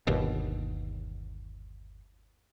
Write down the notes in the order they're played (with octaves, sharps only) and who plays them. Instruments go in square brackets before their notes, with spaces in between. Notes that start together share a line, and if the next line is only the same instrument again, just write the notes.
[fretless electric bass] G1 D#2 B2